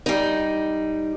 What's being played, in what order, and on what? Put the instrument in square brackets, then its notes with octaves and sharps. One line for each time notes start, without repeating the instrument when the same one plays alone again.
[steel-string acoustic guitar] G3 D#4